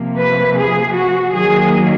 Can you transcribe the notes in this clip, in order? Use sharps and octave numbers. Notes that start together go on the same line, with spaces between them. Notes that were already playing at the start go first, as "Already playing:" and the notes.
Already playing: C3 F3 A#3
B4
G#4
F#4
D#3 F#3 A#3 G#4